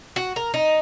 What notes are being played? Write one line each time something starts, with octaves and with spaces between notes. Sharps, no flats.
F#4
A#4
D#4